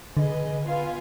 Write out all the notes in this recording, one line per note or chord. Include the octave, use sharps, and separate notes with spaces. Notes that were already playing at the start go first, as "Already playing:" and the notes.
D3 G#4 B4 D#5
B3 F4 B4 F5 G#5